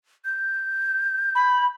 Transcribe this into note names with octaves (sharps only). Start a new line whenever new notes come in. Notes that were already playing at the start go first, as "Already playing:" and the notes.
G6
B5